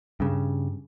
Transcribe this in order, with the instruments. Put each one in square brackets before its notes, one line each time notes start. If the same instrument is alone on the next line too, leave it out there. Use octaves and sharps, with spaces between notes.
[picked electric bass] G2 C#3